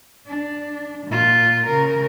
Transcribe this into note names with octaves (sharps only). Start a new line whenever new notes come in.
D4
A#2 F4
C#3 A#4